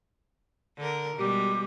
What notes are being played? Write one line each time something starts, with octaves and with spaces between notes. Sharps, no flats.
D3 A#4
B2 G3 G#3 G4